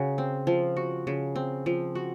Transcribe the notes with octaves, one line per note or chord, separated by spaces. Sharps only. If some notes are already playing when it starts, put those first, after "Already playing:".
Already playing: C#3 F#4
C4
F3
F#4
C#3
C4
F3
F#4